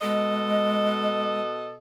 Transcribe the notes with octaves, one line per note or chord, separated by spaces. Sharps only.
B2 G#3 A4 D#5